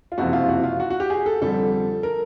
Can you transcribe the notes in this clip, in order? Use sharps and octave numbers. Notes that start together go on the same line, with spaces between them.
F4
F#1 F2 C3 E3 F#4
F4
F#4
F4
F#4
F#4
G4
G#4
A4
F2 D3 G3 A4
A#4